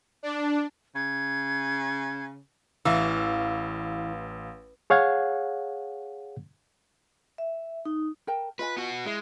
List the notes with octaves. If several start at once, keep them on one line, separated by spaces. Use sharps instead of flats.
D4
C#3 G#6
A1 E3 F5 E6
G#4 C#5 F5 F#5 G#6
E5
D#4
A#4 G5 A5
F4 B4 D#5 G#5
B3 F#4
G#3 E4 E5